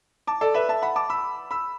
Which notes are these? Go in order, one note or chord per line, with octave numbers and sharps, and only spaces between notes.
A5 D6
A4 D5
B4 E5
E5 A5
F#5 B5
A5 D6
B5 E6
B5 E6